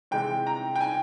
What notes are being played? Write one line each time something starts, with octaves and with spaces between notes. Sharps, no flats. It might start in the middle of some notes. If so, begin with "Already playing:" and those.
C3 E3 G#3 G5
A#5
G5
G#5